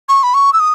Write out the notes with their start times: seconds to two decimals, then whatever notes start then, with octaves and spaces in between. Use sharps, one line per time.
0.09 C#6
0.23 B5
0.34 C#6
0.53 E6
0.60 D#6